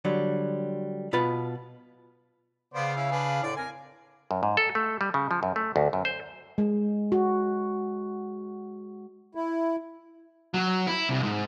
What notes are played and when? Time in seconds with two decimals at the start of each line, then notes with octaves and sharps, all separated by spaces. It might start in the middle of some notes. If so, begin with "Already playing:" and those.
0.05 D3 F#3 G3
1.13 B2 F4 B4 A5
2.74 C#3 B3 C5 D5 F5
2.96 C#4 E4
3.11 D4 G#4 B4
3.43 A2 D3 D5
3.57 F2 A#4 G#5
4.31 F#2
4.43 G#2
4.57 A4
4.75 A3
5.01 G3
5.14 C#3
5.31 F3
5.43 F#2
5.56 A3
5.76 D2
5.93 F#2
6.05 C5
6.58 G#3
7.12 F#4
9.35 E4
10.54 F#3
10.87 E4
11.10 C2
11.23 G#2